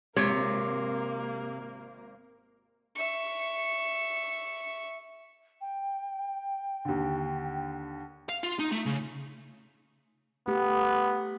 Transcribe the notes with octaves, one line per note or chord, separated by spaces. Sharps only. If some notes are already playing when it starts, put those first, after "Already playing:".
G#1 C3 A#3 C#5
E5 C#6
G5
D#2 D3
F5
F4
D#4
A3
C#3
A3 B3 G4